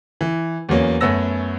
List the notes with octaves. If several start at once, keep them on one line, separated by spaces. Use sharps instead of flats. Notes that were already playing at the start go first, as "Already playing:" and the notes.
E3
E2 F#3 A#3 C#4
F#2 A3 B3 C#4 E6 A#6